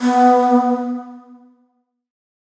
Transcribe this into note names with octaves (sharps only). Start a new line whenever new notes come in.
B3